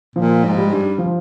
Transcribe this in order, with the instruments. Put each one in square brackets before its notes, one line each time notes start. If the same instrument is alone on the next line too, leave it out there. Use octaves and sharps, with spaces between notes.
[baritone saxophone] A#2 [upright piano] F3
[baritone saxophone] G#2
[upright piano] G3
[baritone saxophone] G2
[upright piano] F3